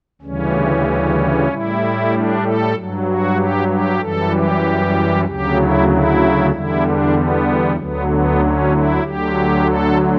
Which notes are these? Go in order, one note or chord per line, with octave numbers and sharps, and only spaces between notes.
D2 C#3 E3 G3 C#4
A2 G3 E4
D4
A4
G2 F#3
F#4
G4
G4
F#2 E3 G3 A4
G4
D2 C#3 F#3 G4
E4
E4
E2 D3 G3 E4
D4
B3
D2 D3 F#3 B3
B3
C#4
E4
D2 D3 F#3 G4
A4